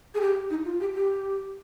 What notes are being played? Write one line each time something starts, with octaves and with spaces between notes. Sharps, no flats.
G#4
G4
D#4
F4
G4
G4